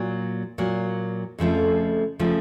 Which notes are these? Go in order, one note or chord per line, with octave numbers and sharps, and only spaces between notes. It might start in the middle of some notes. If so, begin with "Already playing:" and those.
Already playing: A#2 F#3 A#3
A#2 F#3 A#3
F2 C#3 F3 A3
C#3 F3 A3